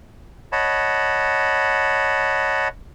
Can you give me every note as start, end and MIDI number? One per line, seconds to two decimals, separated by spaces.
0.52 2.68 73
0.52 2.68 75
0.52 2.68 78
0.52 2.68 81
0.52 2.68 83